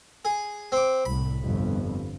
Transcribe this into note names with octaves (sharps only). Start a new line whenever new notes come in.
G#4
C4 D6
C2 A2 B5
G1 F2